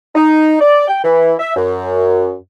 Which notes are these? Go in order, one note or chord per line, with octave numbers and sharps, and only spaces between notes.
D#4
D5
G5
E3
E5
F#2